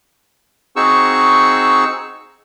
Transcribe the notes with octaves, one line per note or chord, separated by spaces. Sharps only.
C4 D#4 F#4 G#4 C#6 E6